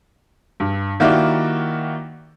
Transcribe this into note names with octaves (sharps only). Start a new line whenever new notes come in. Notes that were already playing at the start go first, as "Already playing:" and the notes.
G2
D#3 A#3 E4 F#4 G4 D5